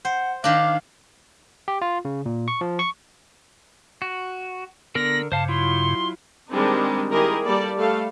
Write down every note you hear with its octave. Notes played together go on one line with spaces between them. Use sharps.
C5 F#5
D#3 D4 F5 D6
G4
F4
C#3
A#2
C#6
F3
C#6
F#4
D3 B3 A#4 A#6
G2 C#3 C5 F5 A5
F#3 E4 F4 C6
D#3 G3 G#3 C4 D4 D#4
D#3 E4 G4 G#4 A#4 D#5
G3 A#3 A4 D5
G3 A3 A4 F5